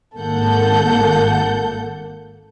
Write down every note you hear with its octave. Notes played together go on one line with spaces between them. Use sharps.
G#1 A#3 A4 F#5 G6